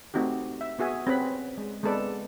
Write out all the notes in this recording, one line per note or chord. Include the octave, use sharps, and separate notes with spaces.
A3 C4 D#4 F#4 G4
E5
B3 F#4 G#4 E5 G#5
C4 C#4 G#4 B4 F#5 B5
G#3
G#3 B3 C4 A4 B4 D5